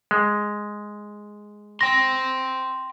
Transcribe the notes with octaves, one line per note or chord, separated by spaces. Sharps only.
G#3
G5 C6 A#6